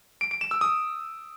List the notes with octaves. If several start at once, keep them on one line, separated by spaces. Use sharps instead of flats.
D7
D7
E7
E6
D#6